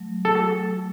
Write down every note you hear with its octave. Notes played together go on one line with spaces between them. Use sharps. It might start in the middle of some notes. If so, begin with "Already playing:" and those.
Already playing: F#3 A3
A4